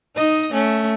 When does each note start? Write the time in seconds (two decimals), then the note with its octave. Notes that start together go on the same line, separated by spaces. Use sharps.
0.16 D#4 D#5
0.53 A3 C#4